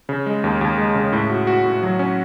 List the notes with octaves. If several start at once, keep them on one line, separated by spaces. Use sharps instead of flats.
C#3
G#3
D#2
D#2
G#3
C#3
A2
F#4
F#4
A2
F#3
C#4